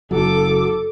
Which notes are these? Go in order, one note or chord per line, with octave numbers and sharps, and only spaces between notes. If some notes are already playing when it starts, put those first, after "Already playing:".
F#1 F#3 A4 D6